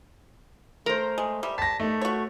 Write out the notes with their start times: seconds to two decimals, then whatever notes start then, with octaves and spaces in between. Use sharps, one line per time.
0.86 A3 A#4 C5
1.18 G#3
1.43 G3 E5
1.58 A5 A#6 B6
1.80 A3 D#4
2.01 F#4 C#5